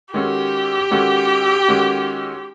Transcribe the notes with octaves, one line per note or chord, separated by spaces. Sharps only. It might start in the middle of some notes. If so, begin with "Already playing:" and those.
D#3 G#3 C#4 F#4 G4 A4
D#3 G#3 C#4 F#4 A4
D#3 G#3 C#4 F#4 A4